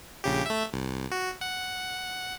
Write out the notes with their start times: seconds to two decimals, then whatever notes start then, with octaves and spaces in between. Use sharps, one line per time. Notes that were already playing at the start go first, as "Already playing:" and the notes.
0.24 A#1 C#3 G4
0.46 A3 E5
0.73 C2
1.11 F#4
1.41 F#5